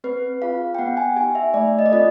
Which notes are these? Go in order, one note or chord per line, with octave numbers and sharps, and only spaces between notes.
C4 B4
F4 G#4 F5
G5
B3 F#5
G#5
D#4 G4 G#5
E5
A3 D5
D#5
D5
C4 F4 A4 D#5